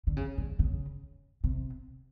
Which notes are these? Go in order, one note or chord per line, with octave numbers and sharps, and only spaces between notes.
D3
C#3
D3
C#3
C3